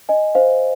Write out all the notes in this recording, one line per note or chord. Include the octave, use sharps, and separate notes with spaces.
D#5 G#5
C5 F5